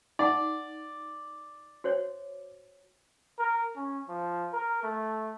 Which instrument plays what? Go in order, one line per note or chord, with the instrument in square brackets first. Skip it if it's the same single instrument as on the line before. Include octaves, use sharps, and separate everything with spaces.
[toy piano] D#4 F#5 [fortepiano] D5
[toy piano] F#4 C5 C#5
[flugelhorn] A#4
C#4
F3
A#4
A3